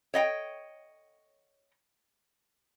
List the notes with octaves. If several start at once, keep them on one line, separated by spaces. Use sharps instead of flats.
C#5 D#5 F#5 G5